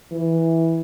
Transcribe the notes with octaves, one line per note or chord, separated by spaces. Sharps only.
E3